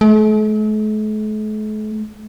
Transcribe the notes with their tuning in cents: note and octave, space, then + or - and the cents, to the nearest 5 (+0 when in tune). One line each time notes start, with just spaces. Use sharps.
A3 -45